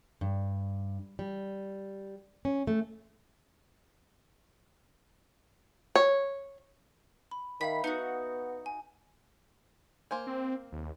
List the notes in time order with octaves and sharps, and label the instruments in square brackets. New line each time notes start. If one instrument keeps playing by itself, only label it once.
[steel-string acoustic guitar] G2
G3
C#4
A3
[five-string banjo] C#5
[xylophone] B5
[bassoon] D#3 [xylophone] E5 F5 B6 [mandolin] B5
[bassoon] B3 [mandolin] D#4 F#4
[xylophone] G#5
[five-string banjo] A#3 C5 G#5
[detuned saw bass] C4
D#2